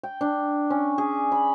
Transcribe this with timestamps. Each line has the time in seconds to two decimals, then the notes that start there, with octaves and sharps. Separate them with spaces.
0.03 G5
0.21 D4
0.70 C#4
0.98 G#4
1.32 B5